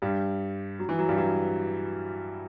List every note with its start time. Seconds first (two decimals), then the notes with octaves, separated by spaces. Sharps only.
0.02 G2 G3
0.79 F#3
0.89 E3
0.99 F#3
1.09 G2 G3
1.18 F#3